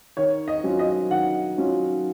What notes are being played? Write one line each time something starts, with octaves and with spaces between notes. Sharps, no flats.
D#3 C#5
D#5
F#3 C#4 F4
D#5
D#3 F#5
F#3 C#4 F4